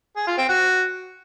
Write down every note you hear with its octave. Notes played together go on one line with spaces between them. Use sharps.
G#4
F4
C4
F#4